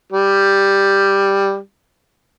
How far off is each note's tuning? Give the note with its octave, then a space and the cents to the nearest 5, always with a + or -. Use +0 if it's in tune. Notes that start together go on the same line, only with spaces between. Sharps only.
G3 +5